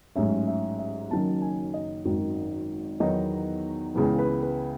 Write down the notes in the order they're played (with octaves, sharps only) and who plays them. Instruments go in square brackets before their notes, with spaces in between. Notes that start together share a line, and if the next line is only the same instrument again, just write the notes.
[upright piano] A1 G#2 F#3 C#4 E5
E5
E5
F#1 F#2 D#3 F#3 C#4 A5
G#5
D#5
G#1 F#2 D#3
E2 D#3 F#3 B3 D#4 D#5
C#2 C#3 E3 B3
B4
B4